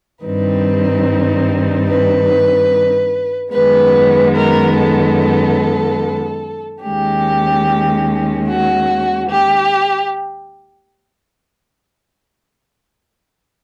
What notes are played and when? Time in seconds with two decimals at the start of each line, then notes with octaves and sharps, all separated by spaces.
0.24 G2 D#3 G3 C4 D#4 B4
1.89 B4
3.53 F#2 D#3 G#3 B3 B4
4.36 A#4
4.77 A4
6.83 D#2 D#3 G#3 C#4 G4
8.47 F#4
9.30 G4